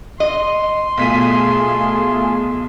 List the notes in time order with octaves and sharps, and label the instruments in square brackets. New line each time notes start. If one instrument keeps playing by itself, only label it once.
[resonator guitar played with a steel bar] D#5 [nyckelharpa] C6
[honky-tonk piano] B1 B6 D#7 [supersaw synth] A3 F4 G#4